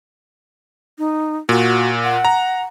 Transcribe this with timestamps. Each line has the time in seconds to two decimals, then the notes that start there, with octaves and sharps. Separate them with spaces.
0.99 D#4
1.49 A#2 F#4
2.04 F#5
2.25 A#5